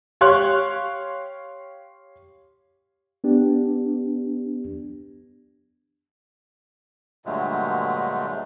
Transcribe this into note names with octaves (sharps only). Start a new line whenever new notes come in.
G4 C#5 F5 C6 F#6
B3 D4 G4
G2 A#2 D3 F#3 G#3 A3